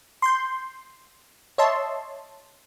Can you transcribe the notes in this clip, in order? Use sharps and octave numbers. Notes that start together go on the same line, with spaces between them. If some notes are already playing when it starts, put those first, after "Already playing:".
C6 G6
C#5 D#5 E5 A5 C6